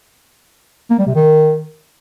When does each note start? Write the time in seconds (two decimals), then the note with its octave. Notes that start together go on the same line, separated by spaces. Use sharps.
0.90 A#3
0.99 G3
1.07 C3
1.15 D#3